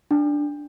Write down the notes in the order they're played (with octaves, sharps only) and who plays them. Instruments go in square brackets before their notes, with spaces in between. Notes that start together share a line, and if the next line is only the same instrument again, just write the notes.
[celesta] D4